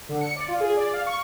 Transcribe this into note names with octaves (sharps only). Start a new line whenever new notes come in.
D3
C#7
D5
F4
G#4
D5
F5
C#6